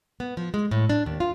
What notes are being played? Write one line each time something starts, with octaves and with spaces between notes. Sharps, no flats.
B3
F3
G#3
A2
D4
D#2
F4